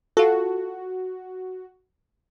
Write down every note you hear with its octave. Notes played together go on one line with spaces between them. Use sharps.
F4 F#4 A4